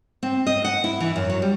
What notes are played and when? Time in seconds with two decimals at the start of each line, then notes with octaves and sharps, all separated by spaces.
0.23 C4
0.47 D#5
0.64 F#5
0.84 E4
1.00 E3
1.16 F#2
1.30 F#3
1.42 G3